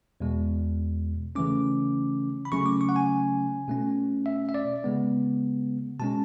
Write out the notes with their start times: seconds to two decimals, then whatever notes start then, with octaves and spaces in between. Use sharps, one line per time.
0.20 E2 B2 G#3
1.35 C#3 E3 A3 C#4 D6
2.45 B5
2.52 C#3 F#3 A3 C#4 C#6
2.66 D6
2.81 C#6
2.89 F#5
2.96 G#5
3.68 B2 A3 C#4
4.26 E5
4.49 E5
4.54 D5
4.84 C#3 G#3 B3
6.00 B2 G#3 C#4 A5